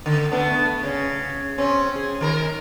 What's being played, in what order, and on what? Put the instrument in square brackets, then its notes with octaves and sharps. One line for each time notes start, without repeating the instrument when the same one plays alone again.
[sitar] D3
A3 B3 D4
C#3
C#3 C4 C#4
G#4
D#3 A#4